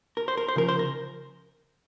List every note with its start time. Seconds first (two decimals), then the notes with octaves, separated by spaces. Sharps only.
0.17 A#4
0.28 C5
0.37 A#4
0.48 C5
0.56 C#3 F3 A#4
0.68 C5
0.79 A#4